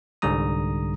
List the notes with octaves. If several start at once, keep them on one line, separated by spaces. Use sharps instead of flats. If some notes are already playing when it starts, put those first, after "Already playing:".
C2 G#2 D3 G3 A#5 D#6